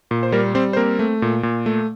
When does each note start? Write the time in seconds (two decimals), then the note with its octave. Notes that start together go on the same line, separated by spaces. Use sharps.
0.11 A#2
0.23 C5
0.32 G3 A#3 A#4
0.55 G3 C4 C5
0.73 C5
0.77 A#3 C4 A#4
0.99 A3
1.22 A#2
1.43 A#2
1.66 A3